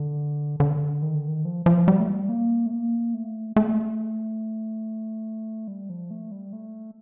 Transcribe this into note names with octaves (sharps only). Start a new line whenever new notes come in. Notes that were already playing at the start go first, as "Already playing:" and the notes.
Already playing: D3
D3
D#3
D3
D#3
F3
F3
G3
A3
G3
A#3
A3
A#3
A3
A3
G3
F3
A3
G3
A3